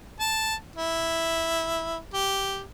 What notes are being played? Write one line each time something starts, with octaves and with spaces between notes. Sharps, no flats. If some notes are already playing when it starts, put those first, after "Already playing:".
A5
E4
G4